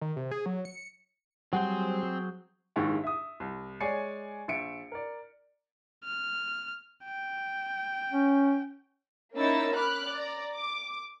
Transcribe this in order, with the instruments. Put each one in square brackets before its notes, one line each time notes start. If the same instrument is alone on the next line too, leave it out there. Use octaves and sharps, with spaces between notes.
[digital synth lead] D#3
C3
G#4
F#3
C#7
[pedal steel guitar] F#3 G#4 C5 [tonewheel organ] G3 [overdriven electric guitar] C4 [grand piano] F#5
[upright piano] A#1 G#2 D#3 E4 G4 C#6
E5 D#6
C2
G#3 C#5 D5 G#5 C7 C#7
A#1 E5 C#7 D7
A#4 D5
[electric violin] F6
G5
[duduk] C#4
[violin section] A#3 C#4 D#4 E4 E6 A6
B5 D6 F6 F#6
D5 A#5
D6